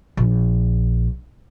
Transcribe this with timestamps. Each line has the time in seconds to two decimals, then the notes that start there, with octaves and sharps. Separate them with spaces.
0.17 A#1